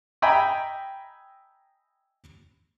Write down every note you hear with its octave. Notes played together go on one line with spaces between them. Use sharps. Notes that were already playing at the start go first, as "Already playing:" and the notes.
D#5 E5 G5 G#5 A#5 B5